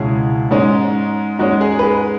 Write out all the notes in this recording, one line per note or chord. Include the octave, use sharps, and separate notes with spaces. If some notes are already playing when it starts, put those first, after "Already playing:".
Already playing: C#2 B2 G#3 C#4 E4 G#4
G#2 G#3 C#4
G#2 G#3 C#4 F#4
G#4
B4
G#4